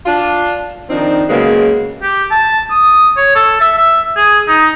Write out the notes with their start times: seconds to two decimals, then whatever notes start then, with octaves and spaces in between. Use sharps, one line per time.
0.06 D4 F4
0.90 D#3 F3 C4 D4 D#4
1.29 C#3 F#3 G#3 A#3 B3
2.02 G4
2.31 A5
2.71 D#6
3.17 C#5
3.35 A4
3.61 E5
3.78 E5
4.17 G#4
4.48 D#4